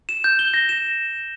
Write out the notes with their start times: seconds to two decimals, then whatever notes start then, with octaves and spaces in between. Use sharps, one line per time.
0.09 E7
0.24 G6
0.39 G7
0.54 A#6
0.69 E7